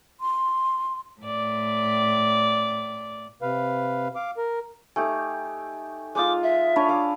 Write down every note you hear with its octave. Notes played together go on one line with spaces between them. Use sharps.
C6
A2 D5
C3 B4 F5
F5 D6
A#4
A3 D#4 G4 G#5
G#3 D#4 F4 D6
E5
D4 C#5 A5 B5 D6
F5 D6 E6